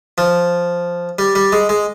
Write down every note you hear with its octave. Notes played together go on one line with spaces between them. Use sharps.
F3
G3
G3
G#3
G#3